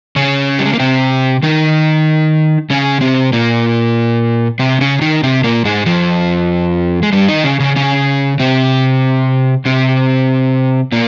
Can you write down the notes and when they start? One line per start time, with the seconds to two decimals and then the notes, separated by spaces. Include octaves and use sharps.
0.16 C#3 C#4
0.59 G3
0.65 G#3
0.73 A#3
0.80 C3 C4
1.43 D#3 D#4
2.70 C#3 C#4
3.01 C3 C4
3.33 A#2 A#3
4.59 C3 C4
4.81 C#3 C#4
5.01 D#3 D#4
5.23 C3 C4
5.44 A#2 A#3
5.65 G#2 G#3
5.86 F2 F3
7.03 G#3
7.13 G2 G3
7.28 D#3 D#4
7.44 C#3 C#4
7.60 C#3 C#4
7.76 C#3 C#4
8.40 C3 C4
9.65 C3 C4
10.92 A#2 A#3